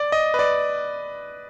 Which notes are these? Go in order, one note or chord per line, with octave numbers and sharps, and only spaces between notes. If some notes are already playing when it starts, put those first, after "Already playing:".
Already playing: D5
D#5
B4
D5